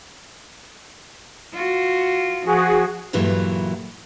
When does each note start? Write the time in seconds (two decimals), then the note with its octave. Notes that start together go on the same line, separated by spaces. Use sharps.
1.54 F4 F#4
2.46 F3 F#4 G#4
3.13 G2 A#2 E3 F#3 A3